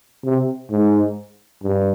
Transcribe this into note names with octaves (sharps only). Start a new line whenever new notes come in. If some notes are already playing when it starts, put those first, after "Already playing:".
C3
G#2
G2